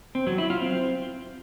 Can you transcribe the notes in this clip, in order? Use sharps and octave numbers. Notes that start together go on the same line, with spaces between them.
C4
F#3
E4
F4
C4